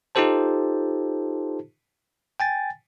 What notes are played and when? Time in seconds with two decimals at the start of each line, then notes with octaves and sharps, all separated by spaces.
0.15 D#4 F4 G4 A4 C5 A5
2.40 G5 G#5 A6